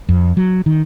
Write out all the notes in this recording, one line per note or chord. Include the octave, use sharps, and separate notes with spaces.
F2
F#3
D#3